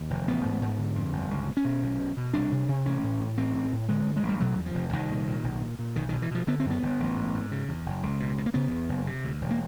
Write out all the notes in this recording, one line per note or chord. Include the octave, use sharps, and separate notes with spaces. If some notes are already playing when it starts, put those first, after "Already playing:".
Already playing: D#2
F1
A1 B3
G#2
G#2
D3
F2
G1
C#2
B2
C#4
B2
B1
B2
B2
C2 D4
C3
C3
A1 C#4
A2
A2
A1 C4
A2
A2
D3 G#3
G2
G#3
A1
G3
B2 F#3
E2
F3
F1
C2 D#3
A#2
A#2
B1
A#2
A#2
B1 D#3
D#3
B2
E3
B2 F3
D3 B3
C4
F#2
B3
G1
A1
G#2
G#2
C#3
E2
F#1
C#2
B2
B2
A#3
C#3 B3
E2
F#1
C3
D2
E1
A#3